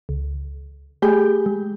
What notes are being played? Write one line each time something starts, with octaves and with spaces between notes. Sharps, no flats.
C#2
A3 G4 G#4 B5 G6
G#3